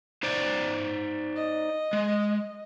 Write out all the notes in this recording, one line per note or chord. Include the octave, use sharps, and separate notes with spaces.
D#4 C5 D5
D#5
G#3